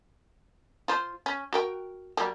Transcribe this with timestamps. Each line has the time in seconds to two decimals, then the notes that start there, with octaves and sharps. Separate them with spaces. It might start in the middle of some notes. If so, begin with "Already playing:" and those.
0.88 F4 C5
1.26 C#4
1.53 F#4 A#4 G5
2.17 F#3 G3 A#3